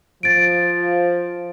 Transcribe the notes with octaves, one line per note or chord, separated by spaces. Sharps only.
F3 A6 D7